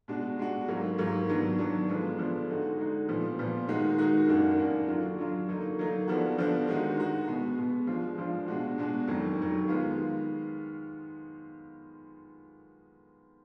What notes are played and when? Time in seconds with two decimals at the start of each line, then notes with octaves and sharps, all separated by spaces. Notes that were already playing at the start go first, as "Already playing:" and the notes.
0.08 B2 G#3 D4 F#4
0.38 B2 G#3 D4 F#4
0.68 G#2 F#3 A#3
0.98 G#2 F#3 A#3
1.28 D#3 F#3 B3 D4
1.58 D#3 F#3 B3 D4
1.89 D3 F3 G#3 B3 D4
2.18 D3 F3 G#3 B3 D4
2.49 D3 G#3 D#4 F#4
2.79 D3 G#3 D#4 F#4
3.09 A#2 F3 B3
3.39 A#2 F3 B3
3.68 D#3 G#3 D#4 F#4
3.98 D#3 G#3 D#4 F#4
4.27 F#2 D#3 A#3 D4 F#4
4.57 F#2 D#3 A#3 D4 F#4
4.87 D3 F#3 D4 F4
5.17 D3 F#3 D4 F4
5.47 D3 F#3 A#3 D#4
5.78 D3 F#3 A#3 D#4
6.08 D3 F3 B3 D4 F#4
6.38 D3 F3 B3 D4 F#4
6.68 D#3 G#3 D#4 F#4
6.97 D#3 G#3 D#4 F#4
7.27 B2 G#3 B3
7.57 B2 G#3 B3
7.87 F3 G#3 D4 F4
8.18 F3 G#3 D4 F4
8.47 B2 G#3 D4 F#4
8.78 B2 G#3 D4 F#4
9.08 F2 D#3 F#3
9.38 F2 D#3 F#3
9.68 D#3 G#3 B3 F4